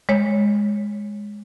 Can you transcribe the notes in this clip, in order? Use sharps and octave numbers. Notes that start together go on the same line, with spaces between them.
G#3 C#5